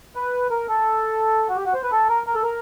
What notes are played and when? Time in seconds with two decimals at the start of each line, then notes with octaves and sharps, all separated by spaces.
0.16 B4
0.51 A#4
0.68 A4
1.49 F#4
1.56 G4
1.65 F#4
1.74 C5
1.83 B4
1.92 A4
2.09 A#4
2.27 A#4
2.35 A4
2.43 A#4